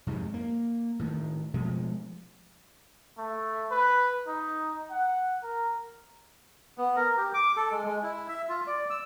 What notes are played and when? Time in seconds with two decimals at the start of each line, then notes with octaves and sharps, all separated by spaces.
0.07 F2 G#2 C3 G#3
0.34 A#3
0.99 A2 D#3
1.54 B2 F3 G#3 A3
3.18 A3
3.71 B4
4.27 D#4
4.90 F#5
5.43 A#4
6.78 B3
6.96 A#4
7.18 G4
7.34 D6
7.57 A4
7.71 G#3
7.84 G#3
8.03 E4
8.29 E5
8.49 F4
8.67 D5
8.90 E6